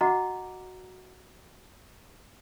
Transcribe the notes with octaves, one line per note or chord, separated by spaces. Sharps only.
F#4 D#5 F#5 A#5 D6